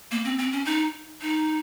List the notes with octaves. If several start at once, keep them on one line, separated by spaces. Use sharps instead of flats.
A#3
C4
C4
C#4
D#4
D#4